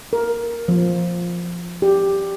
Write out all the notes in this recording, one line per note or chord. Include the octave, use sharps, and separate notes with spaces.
A#4
F3
G4